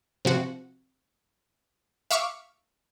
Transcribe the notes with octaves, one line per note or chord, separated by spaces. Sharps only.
C3 F3 F#4
E5 F5 C#6 D6